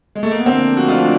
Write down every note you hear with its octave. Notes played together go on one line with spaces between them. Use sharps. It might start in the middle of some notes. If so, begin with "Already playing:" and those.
G#3
A3
A#3
B3
D3 F3 A3 A#3 C4 D4
F#4
D#4 F4